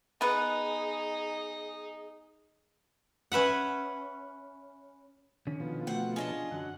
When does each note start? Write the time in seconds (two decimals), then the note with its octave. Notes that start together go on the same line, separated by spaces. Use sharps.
0.21 B3 D#4 G#4 B4
3.32 C#4 B4 E5 F#5
5.47 D3 D#3 C#4
5.60 B2 F3
5.87 A3 C4 F#4 F#5
6.16 C#4 D4 F4 G#4 D#5 A5
6.51 F#2 D3 F#3 F#5